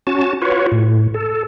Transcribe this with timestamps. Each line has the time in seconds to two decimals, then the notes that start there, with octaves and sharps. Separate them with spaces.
0.07 C#4 F#4 A5
0.42 F4 F#4 B4 C#5
0.72 A2
1.14 A4